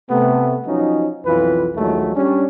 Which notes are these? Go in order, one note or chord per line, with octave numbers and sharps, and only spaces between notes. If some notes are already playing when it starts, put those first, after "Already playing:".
C3 A3 B3
F3 F#3 C#4 D#4
B1 F2 E3 F#3 F4 B4
A#1 D#2 F3 F#3 G#3 A3
G3 C#4 D4